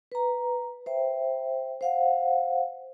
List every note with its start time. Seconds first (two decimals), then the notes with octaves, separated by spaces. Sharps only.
0.12 B4 A#5
0.86 C5 E5 G5
1.81 C5 F5 F#5